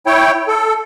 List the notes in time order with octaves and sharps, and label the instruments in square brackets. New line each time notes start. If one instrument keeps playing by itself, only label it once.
[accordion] E4 C#5 G5
A4